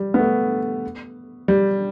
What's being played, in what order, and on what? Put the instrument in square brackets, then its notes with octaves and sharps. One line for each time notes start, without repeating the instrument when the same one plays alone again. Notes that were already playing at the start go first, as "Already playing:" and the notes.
Already playing: [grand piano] G3
B3
A3
G3